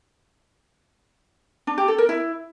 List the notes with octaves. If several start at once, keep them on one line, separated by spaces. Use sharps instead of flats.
D4
G4
A4
A#4
E4